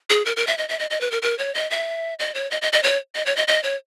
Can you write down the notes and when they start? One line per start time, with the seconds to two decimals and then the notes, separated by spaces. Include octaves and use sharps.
0.10 G#4
0.26 A#4
0.37 A#4
0.47 E5
0.58 D#5
0.69 E5
0.79 D#5
0.90 D#5
1.01 B4
1.12 A#4
1.22 A#4
1.39 C#5
1.55 D#5
1.71 E5
2.19 D#5
2.35 C#5
2.51 D#5
2.62 D#5
2.73 D#5
2.83 C#5
3.15 D#5
3.26 C#5
3.37 D#5
3.48 D#5
3.63 C#5